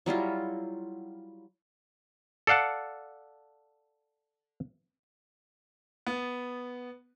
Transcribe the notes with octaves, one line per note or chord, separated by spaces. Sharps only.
F#3 G3 E4 F4
A4 D5 F5 F#5 A5
B3